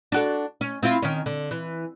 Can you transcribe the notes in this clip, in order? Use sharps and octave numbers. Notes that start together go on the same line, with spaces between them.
D4 F#4 A4
C#4
C4 E4 F4
D#3 C#4
D3
E3